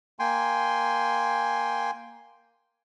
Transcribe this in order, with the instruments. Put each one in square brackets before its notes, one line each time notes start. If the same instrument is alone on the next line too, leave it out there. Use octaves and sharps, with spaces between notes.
[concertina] A#3 G5 G#5 C6